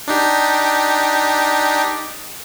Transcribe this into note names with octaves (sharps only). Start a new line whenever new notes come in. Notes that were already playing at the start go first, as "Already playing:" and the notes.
D4 D#4 G4